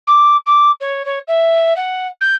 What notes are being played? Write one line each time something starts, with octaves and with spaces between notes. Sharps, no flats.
D6
D6
C#5
C#5
E5
F#5
G6